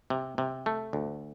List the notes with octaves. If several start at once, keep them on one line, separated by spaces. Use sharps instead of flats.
C3
C3
A3
D2